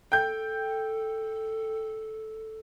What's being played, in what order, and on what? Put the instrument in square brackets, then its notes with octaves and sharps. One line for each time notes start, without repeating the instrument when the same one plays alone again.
[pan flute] A4 [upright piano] G5 G6